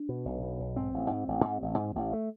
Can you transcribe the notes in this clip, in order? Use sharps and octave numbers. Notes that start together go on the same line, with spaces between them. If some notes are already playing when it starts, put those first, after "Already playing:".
Already playing: D4
B2
B1
B2
B1
G#2 C4
A1
G#2
A1
G#2
A1
G#2
A1
A3